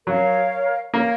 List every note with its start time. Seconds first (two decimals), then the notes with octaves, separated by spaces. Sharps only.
0.07 F#3 A#4 C#5 F5
0.94 A#3 A#4 C#5 F5